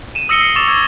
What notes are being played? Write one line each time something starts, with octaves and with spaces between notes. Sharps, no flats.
D#7 E7
D#6 E6 A#6 C#7 D#7 G7
C7
C#6 D6 E6 A6 E7 F7
E6 G#6 C#7